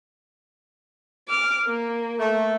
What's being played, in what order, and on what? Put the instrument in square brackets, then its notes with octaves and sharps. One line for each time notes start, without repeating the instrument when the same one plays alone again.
[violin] D6 F6
A#3
[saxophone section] A3